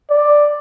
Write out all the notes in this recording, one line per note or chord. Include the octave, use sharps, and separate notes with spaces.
D5